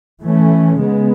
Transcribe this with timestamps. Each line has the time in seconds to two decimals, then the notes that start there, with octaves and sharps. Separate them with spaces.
0.21 E3 A3 C#4
0.76 C#3 G#3 B3